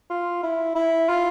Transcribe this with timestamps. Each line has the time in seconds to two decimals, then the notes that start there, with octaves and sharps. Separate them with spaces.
0.10 F4
0.43 E4
0.75 E4
1.08 F4